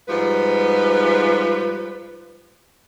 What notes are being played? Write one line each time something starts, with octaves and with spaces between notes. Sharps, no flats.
G#2 F3 G3 B4